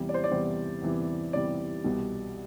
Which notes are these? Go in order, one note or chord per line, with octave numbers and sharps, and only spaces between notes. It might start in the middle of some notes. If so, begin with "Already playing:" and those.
Already playing: E2 C3 E3 G3
D5
C5
D5
E2 C3 E3 G3 C5
E2 C3 E3 G3
E2 C3 E3 G3 D5
C2 B2 G3